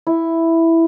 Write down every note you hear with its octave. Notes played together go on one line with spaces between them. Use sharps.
E4